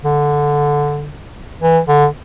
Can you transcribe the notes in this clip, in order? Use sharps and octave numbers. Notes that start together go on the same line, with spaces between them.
D3
E3
D3